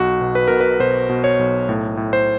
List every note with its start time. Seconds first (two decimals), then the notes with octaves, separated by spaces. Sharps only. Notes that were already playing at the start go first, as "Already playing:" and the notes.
Already playing: B1 F#4
0.21 B2
0.35 B4
0.48 B2 A#4
0.61 B4
0.80 B2 C5
1.09 B2
1.24 C#5
1.39 B1
1.69 A2
1.97 A2
2.13 C5